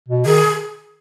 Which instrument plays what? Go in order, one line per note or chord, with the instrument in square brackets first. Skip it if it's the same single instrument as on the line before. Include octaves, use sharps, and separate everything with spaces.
[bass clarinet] B2
[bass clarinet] D#3 [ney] G#4